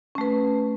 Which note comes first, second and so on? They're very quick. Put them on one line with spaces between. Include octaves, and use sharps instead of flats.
C#4 A3 B4